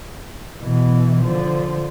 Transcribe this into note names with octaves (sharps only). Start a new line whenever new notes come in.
B2 E3
D3 F3